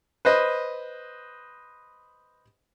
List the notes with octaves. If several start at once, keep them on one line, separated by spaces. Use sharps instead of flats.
B4 C5 D#5